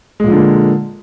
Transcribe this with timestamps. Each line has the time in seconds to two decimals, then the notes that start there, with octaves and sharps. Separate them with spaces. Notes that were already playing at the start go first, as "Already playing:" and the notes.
0.20 G#3
0.24 A#2
0.28 F3
0.32 D3
0.36 A#3